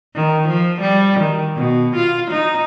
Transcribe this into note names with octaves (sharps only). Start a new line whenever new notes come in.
D#3
F3
G3
D#3
B2
F4
D#4